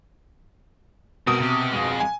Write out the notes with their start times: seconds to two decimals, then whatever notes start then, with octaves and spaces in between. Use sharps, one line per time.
1.27 B2 C4 A#4 D#6
1.40 C3 G4
1.72 F2 G#3
2.00 G#5